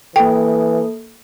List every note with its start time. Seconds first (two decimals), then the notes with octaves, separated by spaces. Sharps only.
0.16 E3 A#3 A4 G5